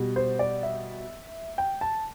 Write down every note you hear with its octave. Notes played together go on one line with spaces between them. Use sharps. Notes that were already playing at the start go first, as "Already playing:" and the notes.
Already playing: B2 G3
C5
D5
E5
G5
A5